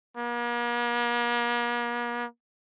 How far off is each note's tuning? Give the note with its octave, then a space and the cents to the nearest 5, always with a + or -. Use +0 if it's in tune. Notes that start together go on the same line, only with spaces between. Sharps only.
A#3 +45